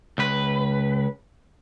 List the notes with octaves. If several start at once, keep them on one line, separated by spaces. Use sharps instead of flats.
C#2 B4